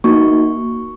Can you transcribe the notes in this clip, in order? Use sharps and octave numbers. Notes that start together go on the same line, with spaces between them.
A#3 D#4 F#4 C#6